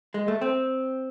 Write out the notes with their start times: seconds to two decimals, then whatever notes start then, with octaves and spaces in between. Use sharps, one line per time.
0.14 G#3
0.28 A3
0.41 C4